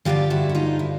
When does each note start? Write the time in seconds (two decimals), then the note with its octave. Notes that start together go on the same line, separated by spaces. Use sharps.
0.05 G2 D3 F3 F4 G4
0.30 E4 F#4
0.49 F#4
0.55 D#4 F4
0.79 E4